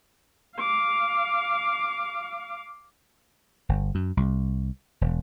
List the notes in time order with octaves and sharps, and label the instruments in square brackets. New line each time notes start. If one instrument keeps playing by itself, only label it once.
[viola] F5 D6
[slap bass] G1
F#2
C2
E1